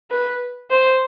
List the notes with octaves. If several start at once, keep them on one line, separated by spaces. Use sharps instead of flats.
B4
C5